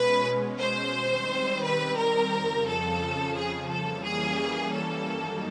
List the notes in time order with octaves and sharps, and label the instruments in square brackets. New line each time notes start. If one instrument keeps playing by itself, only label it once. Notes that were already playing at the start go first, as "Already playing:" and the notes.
Already playing: [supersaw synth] B2 G#3 C#4 [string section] B4
[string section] C5
[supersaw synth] D#3 G3 C4
[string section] B4
A#4
[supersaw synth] F2 C#3 F3
[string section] A4
G#4
[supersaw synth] E3 G3 A#3 C#4 [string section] A4
[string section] G#4
A4
[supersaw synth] G2 D#3 F#3 A#3 D#4